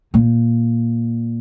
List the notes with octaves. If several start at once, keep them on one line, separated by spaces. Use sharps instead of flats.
A#2